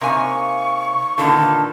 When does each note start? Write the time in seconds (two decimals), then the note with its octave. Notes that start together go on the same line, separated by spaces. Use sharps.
0.01 C3 A#3 D#4 G#5 C#6
1.18 A#2 D3 D#3 F4 A4 B4 A5